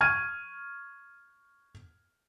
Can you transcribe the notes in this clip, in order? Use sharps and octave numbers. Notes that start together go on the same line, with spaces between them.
C#6 F6 G#6 D#7